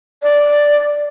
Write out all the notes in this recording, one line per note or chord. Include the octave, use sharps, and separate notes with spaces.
D5